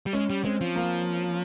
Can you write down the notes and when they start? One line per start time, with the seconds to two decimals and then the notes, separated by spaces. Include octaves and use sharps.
0.06 G3
0.13 G#3 C#4
0.30 G3
0.44 G#3 C4
0.61 F3
0.76 A#3